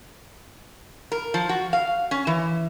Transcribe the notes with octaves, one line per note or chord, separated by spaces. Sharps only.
A#4
F3
F#4
F5
C#4
E3